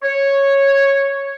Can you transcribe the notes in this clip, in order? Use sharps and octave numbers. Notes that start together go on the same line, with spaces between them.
C#5